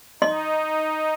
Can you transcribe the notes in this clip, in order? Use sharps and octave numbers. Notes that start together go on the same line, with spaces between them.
D#4 D#5 C6